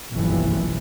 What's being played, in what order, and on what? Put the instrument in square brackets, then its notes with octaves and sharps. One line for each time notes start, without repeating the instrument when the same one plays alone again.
[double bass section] F#1 B1 G2 E3 F3